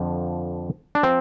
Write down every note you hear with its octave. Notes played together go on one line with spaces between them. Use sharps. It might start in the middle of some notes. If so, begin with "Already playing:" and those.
Already playing: F2 D3 F3
D4
F3 C4